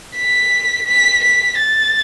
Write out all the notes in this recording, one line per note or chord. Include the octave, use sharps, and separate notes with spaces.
B6
B6
B6
A6